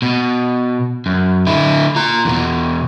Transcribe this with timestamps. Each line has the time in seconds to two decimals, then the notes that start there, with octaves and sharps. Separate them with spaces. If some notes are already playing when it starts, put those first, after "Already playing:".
0.02 B2
1.06 F#2
1.47 D3 E4
1.96 F4 A#5
2.25 E2 B2